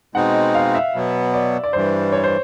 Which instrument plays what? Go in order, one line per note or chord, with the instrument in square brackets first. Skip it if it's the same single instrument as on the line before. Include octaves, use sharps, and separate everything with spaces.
[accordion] B2 G#3 C4 D#4 [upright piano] F#5
[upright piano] F5
E5
[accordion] B2 F#3 B3
[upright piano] D5
D5
[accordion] G2 E3 G3 [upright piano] C5
[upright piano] C#5
C5